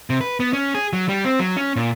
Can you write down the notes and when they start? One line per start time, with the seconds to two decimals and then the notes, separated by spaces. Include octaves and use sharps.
0.10 C3
0.21 B4
0.40 B3
0.53 C#4
0.75 G#4
0.93 F#3
1.09 G3
1.25 C4
1.39 F#3
1.57 C#4
1.76 A#2